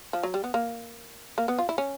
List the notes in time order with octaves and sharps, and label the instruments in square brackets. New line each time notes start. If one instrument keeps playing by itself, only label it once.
[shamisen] F3
F#3
G3
B3
A#3
A#3
B3
F4
E4
C#4